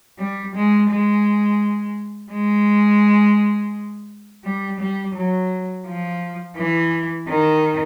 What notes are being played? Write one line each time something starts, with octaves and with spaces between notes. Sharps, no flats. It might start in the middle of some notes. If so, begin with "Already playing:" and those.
G3
G#3
G#3
G#3
G3
G3
F#3
F3
E3
D#3